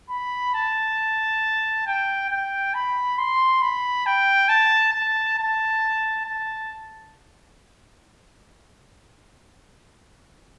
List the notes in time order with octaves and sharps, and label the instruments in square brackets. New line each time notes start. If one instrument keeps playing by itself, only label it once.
[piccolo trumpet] B5
A5
G5
G5
B5
C6
B5
G5
A5
A5
A5
A5